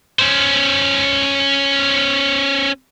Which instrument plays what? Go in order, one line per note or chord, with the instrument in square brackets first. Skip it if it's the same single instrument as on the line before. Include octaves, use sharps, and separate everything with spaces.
[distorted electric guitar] C#4 C5